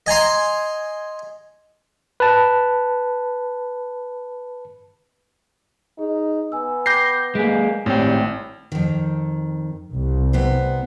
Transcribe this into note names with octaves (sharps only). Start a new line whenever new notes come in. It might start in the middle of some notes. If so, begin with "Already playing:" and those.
D#5 G#5 A#5 C6
B4 A5
D#4 G#4
B3 G#5 E6
G5 B5 D6 G6 A#6 C7
G#3 A#3 G#5 B6 D7
G#1 A2 G3 C4 C#5 G5
F2 D#3
C2
C3 B3 C5